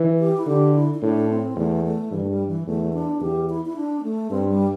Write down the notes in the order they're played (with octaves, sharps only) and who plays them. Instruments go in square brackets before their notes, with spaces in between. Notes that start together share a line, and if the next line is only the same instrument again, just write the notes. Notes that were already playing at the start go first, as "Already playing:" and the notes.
Already playing: [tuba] E3
[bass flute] G4
E4
[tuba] D3 [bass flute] G4
[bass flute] E4
E4
[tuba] A2 [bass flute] D4
[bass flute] C4
[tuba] E2 [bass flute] A3
[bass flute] A3
[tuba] G2 [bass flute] E3
[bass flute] A3
G3
E3
[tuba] E2 [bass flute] A3
[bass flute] D4
[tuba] E2 [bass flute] G4
[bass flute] E4
E4
D4
C4
A3
[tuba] G2 [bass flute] C4
[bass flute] G3